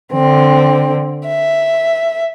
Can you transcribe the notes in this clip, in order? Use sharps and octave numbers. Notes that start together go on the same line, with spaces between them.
D3 C4
E5